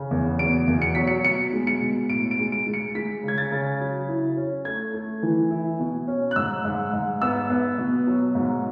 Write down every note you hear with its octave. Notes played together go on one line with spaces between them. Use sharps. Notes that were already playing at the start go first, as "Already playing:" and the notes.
Already playing: C#3
E2
B2 D7
E2
C#7
F#3 B6
C#7
B2 C#7
G#3
C#7
B2
A2 D7
D7
G#3
D7
G#3
C#7
G#3 B6
C#3 G#6
A6
C#3
F#3
E4
C#4
A3 G#6
A3
E3
E4
B2
C#4
F#6
G#2 E6
G#2
G#2
B3 E6
B3
B2
F#3
G#2